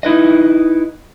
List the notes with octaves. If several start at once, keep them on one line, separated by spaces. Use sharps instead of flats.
D#4 E4 B4 D#5